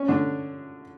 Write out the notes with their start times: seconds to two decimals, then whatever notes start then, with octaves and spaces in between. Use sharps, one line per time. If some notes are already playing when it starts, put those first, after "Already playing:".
Already playing: C#4
0.08 D3 D4